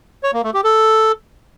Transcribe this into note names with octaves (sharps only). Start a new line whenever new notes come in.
C#5
A#3
A3
G4
A4